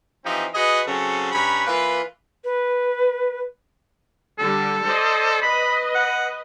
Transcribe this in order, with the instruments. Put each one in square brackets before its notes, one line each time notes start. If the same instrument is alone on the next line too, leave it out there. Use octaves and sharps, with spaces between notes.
[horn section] E3 F3 C4 D#4 G4
F#4 G#4 B4 D#5
C#3 F#3 C4 C#4 A4
G2 C#4 A#5 B5
E3 A#3 F4 B4
[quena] B4
[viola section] D3 G3 [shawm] A4
[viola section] C5 D5 D#5
[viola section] B4 D#5 [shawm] B5
[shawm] F#5